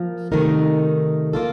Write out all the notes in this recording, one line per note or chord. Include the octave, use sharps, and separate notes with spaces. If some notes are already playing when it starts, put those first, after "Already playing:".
Already playing: F3 A#3 A#4
C3 D#3 A3 D#4 A#4
A#3 F4 A4